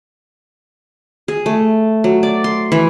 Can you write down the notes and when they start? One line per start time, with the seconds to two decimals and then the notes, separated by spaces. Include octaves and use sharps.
1.28 G#4
1.46 A3
2.04 F#3
2.23 D5
2.44 C6
2.72 E3